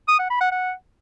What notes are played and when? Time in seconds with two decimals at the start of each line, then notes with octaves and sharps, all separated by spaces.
0.08 D#6
0.19 F#5
0.30 B5
0.41 F#5
0.51 F#5